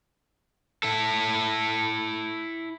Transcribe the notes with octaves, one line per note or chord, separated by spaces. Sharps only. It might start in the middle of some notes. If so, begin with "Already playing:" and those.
E4 A4